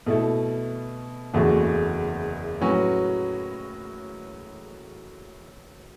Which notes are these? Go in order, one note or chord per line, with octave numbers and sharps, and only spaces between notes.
B2 A3 E4 A4
F#1 E2 C#3 A3 F#4
A2 F#3 C#4 F#4 B4